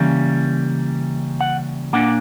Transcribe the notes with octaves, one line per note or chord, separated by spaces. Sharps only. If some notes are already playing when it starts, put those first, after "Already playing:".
Already playing: C#3 E3 G3 A#3 C#4
F#5
A#2 A#3 D4 F#5